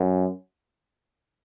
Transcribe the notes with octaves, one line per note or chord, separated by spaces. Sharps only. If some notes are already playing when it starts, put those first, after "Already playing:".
Already playing: F#2